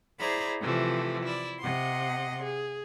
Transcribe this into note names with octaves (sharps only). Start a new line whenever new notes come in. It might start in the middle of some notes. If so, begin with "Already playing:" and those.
E4 G#4 C5 D5 A#5 B5
C3 E3 F3 A3
E4 D5
C3 D#5 F#5 C6
G#4